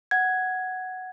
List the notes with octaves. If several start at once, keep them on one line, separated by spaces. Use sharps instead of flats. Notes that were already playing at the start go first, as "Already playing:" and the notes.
F#5 G#6